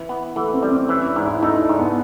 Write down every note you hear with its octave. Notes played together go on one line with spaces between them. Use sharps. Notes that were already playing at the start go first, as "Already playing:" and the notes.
Already playing: E3
B3
E3 A3
C4
G3
C4
E3 C#4
D4
G#2
E4
A3 D#4
D4
G#2
B3